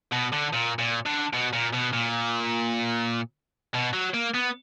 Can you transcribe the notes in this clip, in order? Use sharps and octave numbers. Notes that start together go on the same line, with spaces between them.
B2
D3
A#2
A#2
D3
B2
A#2
B2
A#2
B2
F#3
A#3
B3